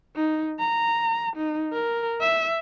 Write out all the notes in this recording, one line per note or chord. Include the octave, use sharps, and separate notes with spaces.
D#4
A#5
D#4
A#4
E5